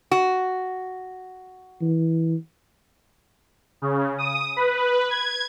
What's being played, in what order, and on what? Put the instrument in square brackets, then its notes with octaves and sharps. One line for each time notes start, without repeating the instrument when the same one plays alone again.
[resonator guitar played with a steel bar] F#4
[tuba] E3
[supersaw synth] C#3
D#6
B4
G#6